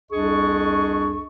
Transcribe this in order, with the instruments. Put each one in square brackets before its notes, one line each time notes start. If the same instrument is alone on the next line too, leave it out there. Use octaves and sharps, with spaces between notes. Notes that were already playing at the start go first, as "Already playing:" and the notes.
[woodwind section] C2 F2 D4 G#4 D#5 C#6